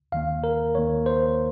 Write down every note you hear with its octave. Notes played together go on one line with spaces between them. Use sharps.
D#2 D#3 A#3 F5
A#4
D#2 D#3 A#3 C#5
C5